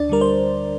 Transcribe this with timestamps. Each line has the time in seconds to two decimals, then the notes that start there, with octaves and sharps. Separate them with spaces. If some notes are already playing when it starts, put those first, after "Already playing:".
Already playing: D2 D4 D5
0.09 D3 G3 A#4
0.21 C5